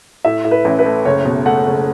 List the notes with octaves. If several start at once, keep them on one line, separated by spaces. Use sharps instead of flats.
A2 E5
A2
B4
A1
B4
A3
F#1 C#5
B2
A3 F#5
F#1